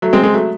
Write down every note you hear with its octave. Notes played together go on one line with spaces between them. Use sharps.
F#3 A3
G#3 C4
G#3 C4
F#3 A3